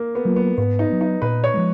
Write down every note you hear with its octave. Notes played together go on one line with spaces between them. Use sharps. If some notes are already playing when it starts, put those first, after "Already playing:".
Already playing: A#3
B3
F#3 A#3 F4
B3
G#2 B3
D#4
F#3 B3
D#4
A#2 B4
C#5
F3 G#3